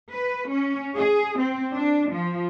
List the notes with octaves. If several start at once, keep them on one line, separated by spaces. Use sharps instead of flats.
B4
C#4
G#4
C4
D4
F3